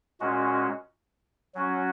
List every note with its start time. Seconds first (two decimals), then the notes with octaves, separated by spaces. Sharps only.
0.20 A#2 G#3 C#4 F#4
1.54 F#3 C#4 F#4